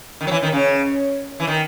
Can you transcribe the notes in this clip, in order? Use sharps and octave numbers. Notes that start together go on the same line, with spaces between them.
D#3
F#3
E3
D#3
C#3
E3
D#3